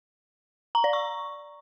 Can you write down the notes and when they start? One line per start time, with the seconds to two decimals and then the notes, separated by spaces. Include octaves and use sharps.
0.75 A#5
0.84 D5
0.93 C#6